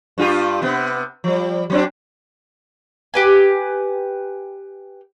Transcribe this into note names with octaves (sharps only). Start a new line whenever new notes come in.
G2 F4 G4
C3 B3
F3 G3
F#3 C4 D4
G4 B4 G#5